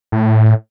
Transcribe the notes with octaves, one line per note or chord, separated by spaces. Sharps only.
A2